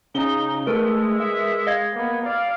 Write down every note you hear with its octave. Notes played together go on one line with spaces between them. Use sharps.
C#3 D#4 G7
G#3 A3 A#4 B4 E6
E5
D#5 F5 G#6
A#3 B3
D5 F5